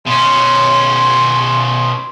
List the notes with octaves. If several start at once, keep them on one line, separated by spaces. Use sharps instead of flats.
B2 C#4 C6